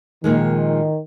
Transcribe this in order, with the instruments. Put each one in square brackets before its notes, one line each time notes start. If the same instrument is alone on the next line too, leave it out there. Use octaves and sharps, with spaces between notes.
[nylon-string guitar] A#2 F3 G#3 [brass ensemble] D#3